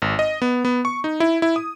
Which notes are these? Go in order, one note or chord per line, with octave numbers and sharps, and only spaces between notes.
G#1
D#5
B3
B3
C#6
D#4
E4
E4
D#6